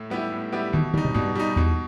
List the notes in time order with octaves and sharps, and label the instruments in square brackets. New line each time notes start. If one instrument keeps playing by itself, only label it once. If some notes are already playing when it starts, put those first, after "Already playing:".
Already playing: [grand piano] A2
G3 B3 E4 G4
A2
G3 B3 E4 G4
[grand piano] B2 [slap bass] D#3
[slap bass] D#3 [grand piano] G3 D#4
[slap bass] C3
[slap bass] G2 [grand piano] B2
[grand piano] G3 D#4
[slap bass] E2 [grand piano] B2